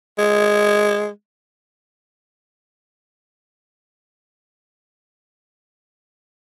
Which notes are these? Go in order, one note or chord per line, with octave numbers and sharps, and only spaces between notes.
G#3